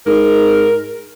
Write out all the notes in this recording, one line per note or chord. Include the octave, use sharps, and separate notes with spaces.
G#2 A#4